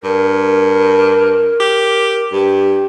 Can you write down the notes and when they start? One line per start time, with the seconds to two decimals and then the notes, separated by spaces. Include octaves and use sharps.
0.03 G2 A#4
1.60 G4
2.32 G2 G4